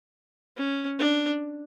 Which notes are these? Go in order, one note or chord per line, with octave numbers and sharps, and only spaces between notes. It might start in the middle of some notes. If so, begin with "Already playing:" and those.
C#4
D4